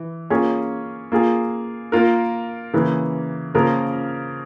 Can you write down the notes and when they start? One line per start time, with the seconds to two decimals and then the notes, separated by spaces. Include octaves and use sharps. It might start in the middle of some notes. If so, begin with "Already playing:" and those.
Already playing: E3
0.30 A#3 C#4 F4 G#4
1.12 A#3 F4 G#4
1.92 A#3 F4 A#4
2.73 C#3 E3 A#3
3.54 C#3 F3 A#3 F4 A#4